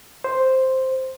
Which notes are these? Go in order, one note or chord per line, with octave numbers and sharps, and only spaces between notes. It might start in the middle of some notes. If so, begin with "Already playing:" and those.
C5